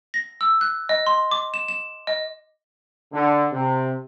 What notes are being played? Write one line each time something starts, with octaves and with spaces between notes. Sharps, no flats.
A#6
E6
F#6
D#5
C6
D6
E7
E7
D#5
D3
C3